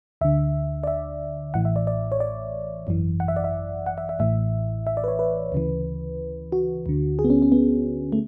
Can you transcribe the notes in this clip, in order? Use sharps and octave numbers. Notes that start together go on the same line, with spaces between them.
D2 D3 E5
D5
E5
A1 A2 E3 F#5
E5
D5
D5
C#5
D5
G#1 F#2 E3
F#5
E5
D5
E5
F#5
E5
E5
A1 A2 E3 E5
E5
D5
B4
C#5
B4
D2 C#3 E3
F#4
D2 D3
G#4
B3
C#4
C#4
B3
A3